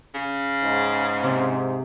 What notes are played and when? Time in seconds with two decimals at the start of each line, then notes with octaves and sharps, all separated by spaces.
0.15 C#3
0.63 G#2
1.23 C3